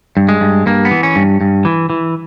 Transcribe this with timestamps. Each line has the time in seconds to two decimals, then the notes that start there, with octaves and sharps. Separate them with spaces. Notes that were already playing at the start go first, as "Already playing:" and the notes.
0.17 G2
0.29 G#3
0.41 G2
0.66 G2 A#3
0.85 B3
0.91 E3
1.03 C#4
1.16 G2
1.41 G2
1.65 E3
1.90 E3